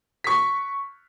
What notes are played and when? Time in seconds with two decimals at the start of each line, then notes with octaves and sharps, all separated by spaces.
0.24 C#6 B6